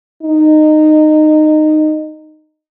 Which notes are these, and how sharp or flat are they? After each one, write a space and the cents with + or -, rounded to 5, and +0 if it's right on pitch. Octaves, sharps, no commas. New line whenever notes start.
D#4 -15